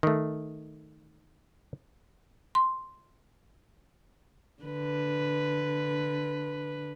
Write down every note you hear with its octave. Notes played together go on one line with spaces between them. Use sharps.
D#3 A3
C6
D3 B4